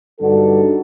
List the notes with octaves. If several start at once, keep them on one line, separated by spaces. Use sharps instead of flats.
G2 D3 D#4 F#4 A4